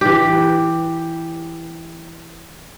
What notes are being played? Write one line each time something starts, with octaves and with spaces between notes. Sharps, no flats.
E3 G4